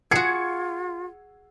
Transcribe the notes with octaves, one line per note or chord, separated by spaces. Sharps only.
F4 F#4 G#4 G#6 C#7